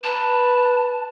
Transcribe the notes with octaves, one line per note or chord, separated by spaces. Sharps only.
B4 A5